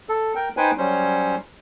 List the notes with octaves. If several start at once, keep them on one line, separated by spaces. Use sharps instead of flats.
A4
A#4 G5
D#4 B4 C5 G5 G#5
F#3 G3 C#4 C5